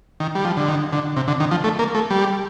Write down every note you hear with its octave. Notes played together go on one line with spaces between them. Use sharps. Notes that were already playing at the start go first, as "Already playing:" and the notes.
D#3
G3
F3
D3
D#3
D3
C3
D3
D#3
F3
A3
A#3
A3
G3